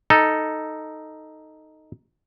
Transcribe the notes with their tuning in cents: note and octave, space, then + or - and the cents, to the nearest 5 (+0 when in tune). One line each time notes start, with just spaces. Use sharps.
D#4 +0 A4 +0